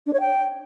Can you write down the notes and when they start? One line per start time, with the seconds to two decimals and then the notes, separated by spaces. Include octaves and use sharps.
0.06 D4
0.13 C#5
0.20 G5